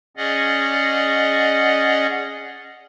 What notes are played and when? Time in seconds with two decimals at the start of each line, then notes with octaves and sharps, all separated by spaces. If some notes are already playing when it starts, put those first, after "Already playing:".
0.17 C#4 G#4 D5 D#5 F#5